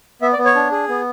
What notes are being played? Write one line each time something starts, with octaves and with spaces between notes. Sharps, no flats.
B3 E5
D5
B3
C#5
D4
G#4
B3